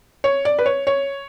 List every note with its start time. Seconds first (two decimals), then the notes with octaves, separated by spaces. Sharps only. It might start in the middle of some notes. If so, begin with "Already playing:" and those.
0.24 C#5
0.45 D5
0.59 B4
0.66 C#5
0.87 C#5